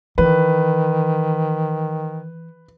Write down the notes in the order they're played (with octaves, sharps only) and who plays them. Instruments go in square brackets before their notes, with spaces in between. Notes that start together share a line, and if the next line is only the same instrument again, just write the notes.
[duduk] D#3 [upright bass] E3 [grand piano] B4